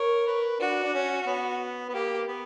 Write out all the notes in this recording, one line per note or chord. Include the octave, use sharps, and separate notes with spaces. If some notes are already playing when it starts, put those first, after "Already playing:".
Already playing: A#4 C#5
B4
D4 F#4
D4
C#4
C#4
B3
B3
A#3 G4
B3